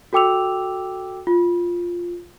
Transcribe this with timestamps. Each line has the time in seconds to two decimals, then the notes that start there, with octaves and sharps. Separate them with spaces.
0.13 F#4 A4 G5 D6 E6 F7
1.27 F4